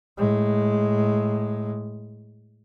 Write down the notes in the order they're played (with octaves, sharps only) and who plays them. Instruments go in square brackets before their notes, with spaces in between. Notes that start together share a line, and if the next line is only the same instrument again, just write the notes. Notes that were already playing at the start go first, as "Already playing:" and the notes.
[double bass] A2 G#3